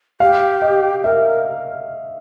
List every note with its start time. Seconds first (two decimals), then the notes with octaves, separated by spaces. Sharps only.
0.20 G4 F5
0.62 D#5
1.03 A#4 E5